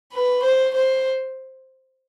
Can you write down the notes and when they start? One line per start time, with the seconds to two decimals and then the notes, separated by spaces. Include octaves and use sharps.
0.13 B4
0.43 C5
0.75 C5